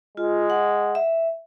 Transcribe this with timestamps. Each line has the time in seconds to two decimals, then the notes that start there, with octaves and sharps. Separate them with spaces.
0.17 G#3 F4
0.50 F#5
0.95 E5